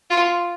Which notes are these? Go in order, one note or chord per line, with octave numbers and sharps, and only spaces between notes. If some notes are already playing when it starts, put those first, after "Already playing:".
F4